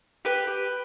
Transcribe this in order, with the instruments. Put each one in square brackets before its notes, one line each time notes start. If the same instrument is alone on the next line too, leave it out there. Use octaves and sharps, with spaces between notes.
[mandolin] G4 B4
G4